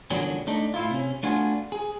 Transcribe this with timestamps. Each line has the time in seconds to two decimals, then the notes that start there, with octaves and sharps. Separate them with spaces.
0.11 E2 A#2 D3 F#3 G3 C#4
0.47 A3 D4 D#4
0.74 A2 E4 F4
0.91 C3 C#4
1.23 A3 B3 D4 F4 F#4 G#5
1.72 G#4